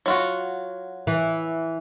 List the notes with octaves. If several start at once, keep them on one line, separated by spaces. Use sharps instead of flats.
F#3 F4 F#4
E3